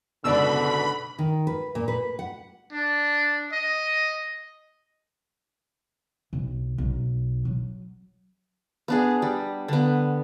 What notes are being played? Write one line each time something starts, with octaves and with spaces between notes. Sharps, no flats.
F#1 G#2 B2 D3 D5 B5 E6
D#3
B4
A#2
B4
F#5
D4
D#5
B1
B1
F#3
B3 D4 G#4
G3
D3 B3